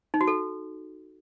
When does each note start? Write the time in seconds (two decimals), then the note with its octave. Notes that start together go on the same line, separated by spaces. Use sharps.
0.14 D#4
0.21 F#4
0.27 A4